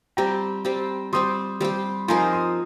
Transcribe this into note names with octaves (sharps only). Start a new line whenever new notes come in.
G3 C4 G4 G5 A#5
G3 C4 G4
G3 C4 G4 C6 D#6
G3 C4 G4
F3 C4 D#4 A#4 G#5 C6
C6 D#6